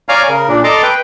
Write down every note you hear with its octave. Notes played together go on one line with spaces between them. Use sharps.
C#5 D5 F5 G#5 A#5 F6
C#3 A#4
A#2 D4
A4 D#5 A5 A#5 C6 D6
B4 G5